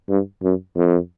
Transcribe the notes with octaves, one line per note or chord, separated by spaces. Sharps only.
G2
F#2
F2